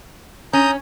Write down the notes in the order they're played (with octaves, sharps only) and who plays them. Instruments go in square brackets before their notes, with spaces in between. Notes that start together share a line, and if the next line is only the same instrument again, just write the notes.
[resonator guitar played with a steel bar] C#4 [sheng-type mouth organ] A#5 D#6 G6